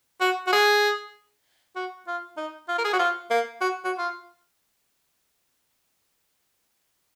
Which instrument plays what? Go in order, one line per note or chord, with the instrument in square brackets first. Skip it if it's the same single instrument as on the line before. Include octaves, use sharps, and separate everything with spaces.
[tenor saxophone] F#4
F#4
G#4
F#4
F4
D#4
F4
A#4
G#4
F#4
F4
A#3
F#4
F#4
F4